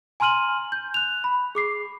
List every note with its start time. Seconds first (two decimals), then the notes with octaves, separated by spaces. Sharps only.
0.20 G#5 A#5 C6 F6 D#7 F#7
0.72 G6
0.94 F#6 F7
1.24 B5
1.55 G#4 D6 C7